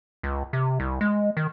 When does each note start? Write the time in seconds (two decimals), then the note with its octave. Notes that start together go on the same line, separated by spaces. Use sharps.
0.23 C#2
0.53 C3
0.80 C2
1.01 G#3
1.37 D#3